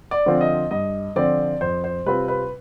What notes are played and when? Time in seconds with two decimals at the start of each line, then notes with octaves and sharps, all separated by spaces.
0.11 D5
0.26 D3 F3 C4 F4
0.41 D#5
0.71 G2 D#5
1.16 D3 F3 C4 F4 D5
1.61 F2 C5
1.84 C5
2.06 C3 G3 C4 F4 B4
2.28 B4